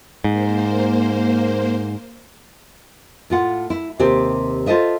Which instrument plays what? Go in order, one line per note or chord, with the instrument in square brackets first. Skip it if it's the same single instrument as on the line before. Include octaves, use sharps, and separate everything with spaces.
[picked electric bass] G#2 [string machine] A#3 C5
[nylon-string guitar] A2 F4 F#5
E4
D#2 C3 C4 G4 C5
F4 A4 C5 D#5 E5